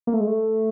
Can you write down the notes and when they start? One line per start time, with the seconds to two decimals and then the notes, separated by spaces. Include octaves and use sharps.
0.07 A#3
0.14 A3
0.20 G#3
0.27 A3